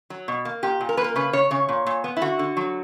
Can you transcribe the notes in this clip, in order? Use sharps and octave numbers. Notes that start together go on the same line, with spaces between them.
F#3
B2
A#3
A#2 G4
A#2
A#4
A#3 B4
A#4
C#3 B4
C#3 C#5
C#3 C#5
A#2
A#2
B3
E4
D3 F#4
D3
F#3